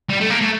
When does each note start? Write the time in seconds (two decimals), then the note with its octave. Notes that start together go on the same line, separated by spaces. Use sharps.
0.10 G3
0.21 A3
0.30 A#3
0.41 A3